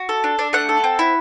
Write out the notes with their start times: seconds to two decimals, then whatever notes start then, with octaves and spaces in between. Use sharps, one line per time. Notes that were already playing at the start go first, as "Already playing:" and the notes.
Already playing: F#4
0.09 A4
0.24 D4
0.39 D4
0.53 A3 F#5
0.69 A4
0.84 C4
0.99 E4